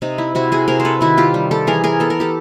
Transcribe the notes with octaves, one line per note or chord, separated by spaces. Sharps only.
C3 D#4
E4
C3 E4 F#4
F#4 G#4
C3 G#4 A#4
C5
A4 B4
D#3 E4 F#4
F4 G4
G3
G4 A4
E3 G#4 A#4
G#4 A#4
B3 A4
A#4
G4 A4